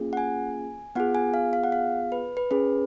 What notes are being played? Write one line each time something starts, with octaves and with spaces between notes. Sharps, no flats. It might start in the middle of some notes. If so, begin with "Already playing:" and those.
Already playing: A#3 C#4 F4 G#4
F#5
G#5
B3 F4 G#4 F#5
G#5
F5
F5
F#5
F5
B4
B4
C#4 G#4 B4